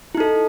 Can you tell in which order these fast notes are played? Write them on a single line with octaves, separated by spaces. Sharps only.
E4 D#4 A4